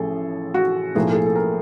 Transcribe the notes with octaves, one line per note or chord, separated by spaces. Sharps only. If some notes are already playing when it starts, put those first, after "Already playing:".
Already playing: A1 A2 F3 G#4 A4
F#4
B1 A2 F3 A#3 G#4
A4
G#4
A4
A#4